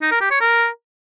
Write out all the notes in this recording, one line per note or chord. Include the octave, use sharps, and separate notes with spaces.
D#4
A#4
G4
C#5
A#4